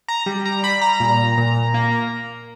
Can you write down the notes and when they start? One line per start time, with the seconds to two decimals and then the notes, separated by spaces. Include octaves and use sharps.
0.08 A#5
0.26 G3
0.46 A#5
0.63 G3 B5
0.81 A#5
1.00 A#2
1.38 A#2
1.74 A#3